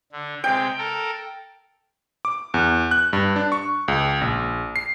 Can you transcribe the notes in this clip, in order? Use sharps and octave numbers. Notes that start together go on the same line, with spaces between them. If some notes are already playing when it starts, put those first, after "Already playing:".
D3
C3 G#3 G5
A4 A#4
D6
E2
F#6
G2
D4
C#6
C#2
A#1
C7